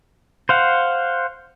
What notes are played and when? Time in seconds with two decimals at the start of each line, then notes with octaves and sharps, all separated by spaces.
0.49 C5 F5 F#5